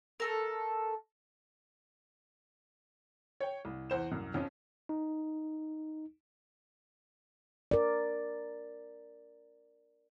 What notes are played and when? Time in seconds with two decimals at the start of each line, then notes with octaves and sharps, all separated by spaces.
0.20 A3 A4 A#4
3.40 C#5 G5
3.65 C2
3.90 E2 C5 E7
4.12 C2 F#2
4.34 F2 F3 C#4
4.89 D#4
7.71 A#4 D5